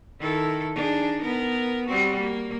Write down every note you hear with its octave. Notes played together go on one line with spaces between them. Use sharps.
D#3 E4 A4
D4 D#4 G#4
B3 A#4
G3 C4 F#4
A#3